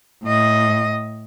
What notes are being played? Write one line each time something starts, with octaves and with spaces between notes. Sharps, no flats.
A2 D#5